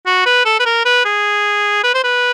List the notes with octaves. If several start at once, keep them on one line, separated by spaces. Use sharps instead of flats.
F#4
B4
A4
B4
A#4
B4
G#4
B4
C5
B4